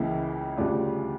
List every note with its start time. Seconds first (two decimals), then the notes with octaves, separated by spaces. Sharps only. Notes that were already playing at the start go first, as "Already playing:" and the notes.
Already playing: C#2 C#3 E3 A#3 E4
0.57 D2 C#3 G3 D4 F4